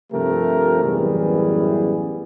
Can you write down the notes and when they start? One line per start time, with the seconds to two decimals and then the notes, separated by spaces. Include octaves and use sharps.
0.13 G2 C3 F3 A3 G4 A#4
0.85 A1 F#2 E3 G3 B3 G#4